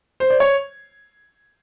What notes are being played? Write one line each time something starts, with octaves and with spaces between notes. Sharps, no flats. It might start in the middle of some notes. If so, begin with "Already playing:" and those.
C5
D5
C#5